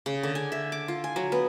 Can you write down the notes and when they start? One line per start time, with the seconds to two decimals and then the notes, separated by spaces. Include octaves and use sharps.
0.06 C#3
0.23 D3
0.35 G#5
0.52 E5
0.72 D6
0.88 F4
1.04 G#5
1.16 F#3
1.32 B3